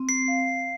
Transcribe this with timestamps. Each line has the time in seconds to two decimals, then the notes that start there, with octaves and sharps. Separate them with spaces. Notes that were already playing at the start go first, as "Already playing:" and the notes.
Already playing: C4
0.09 C7
0.28 F5